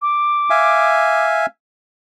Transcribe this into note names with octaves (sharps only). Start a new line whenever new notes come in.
D6
E5 F5 G#5